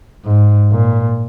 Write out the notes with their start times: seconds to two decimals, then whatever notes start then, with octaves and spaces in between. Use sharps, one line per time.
0.25 G#2
0.71 A#2